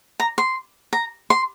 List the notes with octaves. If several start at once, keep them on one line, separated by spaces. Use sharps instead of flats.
A#5
C6
A#5
C6